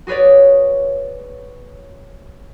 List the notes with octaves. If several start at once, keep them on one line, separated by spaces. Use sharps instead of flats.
F#4 G#4 B4 C#5 D5